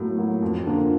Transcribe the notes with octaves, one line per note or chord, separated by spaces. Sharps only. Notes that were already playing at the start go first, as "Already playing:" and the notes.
Already playing: A2 F#3 A#3
F#3 A#3
F2
D3 F3 A#3 D4